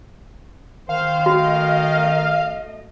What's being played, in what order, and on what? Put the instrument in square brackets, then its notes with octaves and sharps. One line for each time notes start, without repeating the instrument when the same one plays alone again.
[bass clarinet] D#3 [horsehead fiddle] C5 [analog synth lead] F5
[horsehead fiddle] A3 D#5 [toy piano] F#4